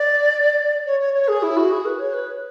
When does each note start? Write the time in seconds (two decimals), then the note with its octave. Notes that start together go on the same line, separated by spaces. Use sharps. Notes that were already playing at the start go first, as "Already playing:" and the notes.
Already playing: D5
0.86 C#5
1.00 C#5
1.14 C#5
1.28 G#4
1.43 E4
1.57 F#4
1.71 G#4
1.85 B4
1.99 C#5
2.13 B4